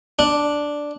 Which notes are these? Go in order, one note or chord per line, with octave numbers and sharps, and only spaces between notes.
D4